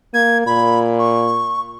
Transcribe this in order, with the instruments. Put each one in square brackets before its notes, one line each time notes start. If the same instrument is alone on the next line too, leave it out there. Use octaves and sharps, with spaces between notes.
[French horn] A#3 [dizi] G#6
[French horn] A#2 [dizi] B5
[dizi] C#6